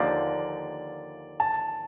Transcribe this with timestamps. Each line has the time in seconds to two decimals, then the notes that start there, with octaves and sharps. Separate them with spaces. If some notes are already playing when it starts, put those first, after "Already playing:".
Already playing: D#2 D3 F3 A#3 D5
1.40 A5